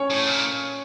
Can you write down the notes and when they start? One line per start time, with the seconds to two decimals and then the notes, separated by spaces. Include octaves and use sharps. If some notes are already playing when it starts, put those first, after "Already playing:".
Already playing: C#4 C#5
0.10 A2
0.27 A#2